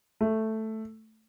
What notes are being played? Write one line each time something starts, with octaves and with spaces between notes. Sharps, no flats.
A3